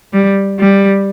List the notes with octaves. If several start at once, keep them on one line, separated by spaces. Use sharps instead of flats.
G3
G3